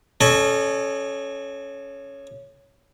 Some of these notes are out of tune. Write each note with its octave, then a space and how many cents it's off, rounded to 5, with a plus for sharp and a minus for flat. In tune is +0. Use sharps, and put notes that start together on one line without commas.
C#4 +0 A4 -25 D#5 -45